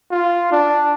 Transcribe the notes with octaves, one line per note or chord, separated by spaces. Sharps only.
F4
D4